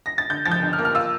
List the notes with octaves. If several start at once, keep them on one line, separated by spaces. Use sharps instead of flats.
A#6
A6
D3 G6
F3 A6
G6
D3
F6
A#3
F6
F4 E6